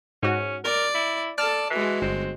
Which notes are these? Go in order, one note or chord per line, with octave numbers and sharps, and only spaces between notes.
G#2 C#4 F#4
A#4 D5
E4
A4 D5 A5 F6
E3 G#3 F#4
G1 C4